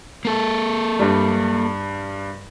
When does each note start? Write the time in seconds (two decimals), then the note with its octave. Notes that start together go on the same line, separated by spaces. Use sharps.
0.25 A#3 A4
0.99 G2 G3